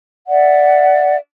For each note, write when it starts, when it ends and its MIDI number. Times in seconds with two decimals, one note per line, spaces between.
0.28 1.16 74
0.28 1.16 76
0.28 1.16 78